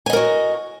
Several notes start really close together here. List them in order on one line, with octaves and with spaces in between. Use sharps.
G#5 D#5 A#4 F#4